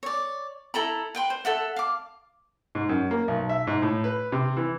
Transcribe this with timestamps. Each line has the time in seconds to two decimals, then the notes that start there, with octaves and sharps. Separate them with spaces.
0.03 C#5 D5
0.74 E4 A4 A#5 B5
1.15 B4 G5 C6
1.30 C5
1.45 A4 E5 F#5
1.76 F5 D6
2.75 G#2
2.89 F#2
3.11 A#3
3.28 B1
3.49 E5
3.67 G#2
3.82 A2
4.04 B4
4.32 C3
4.57 E3